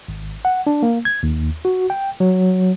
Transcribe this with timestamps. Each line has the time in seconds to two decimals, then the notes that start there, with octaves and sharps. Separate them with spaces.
0.08 G#1
0.45 F#5
0.67 D4
0.83 A#3
1.05 G#6
1.23 D#2
1.65 F#4
1.90 G5
2.20 F#3